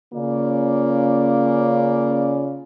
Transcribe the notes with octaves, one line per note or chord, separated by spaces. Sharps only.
C#3 A#3 C#4 F4 D5